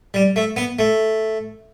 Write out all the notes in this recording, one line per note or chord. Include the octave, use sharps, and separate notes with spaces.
G3
A3
B3
A3